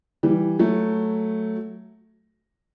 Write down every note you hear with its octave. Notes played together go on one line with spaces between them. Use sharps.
E3 G3
F#3 A3